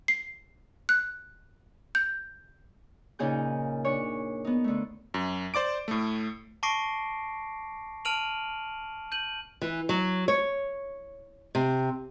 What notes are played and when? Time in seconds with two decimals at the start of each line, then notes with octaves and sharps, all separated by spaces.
0.08 C7
0.89 F#6
1.95 G6
3.19 A#2 C#3 D#4 G#4 G6
3.85 D4 C#5
4.45 B3 D#4
4.64 D3 A3
5.14 F#2
5.54 C5 D5 D6 D7
5.88 A2 A3
6.63 A5 C#6 D6 A#6 C7 D7
8.05 A5 F6 D7 D#7 F7 F#7
9.12 G6 D#7 F#7
9.62 E3
9.89 F#3
10.28 C#5
11.55 C3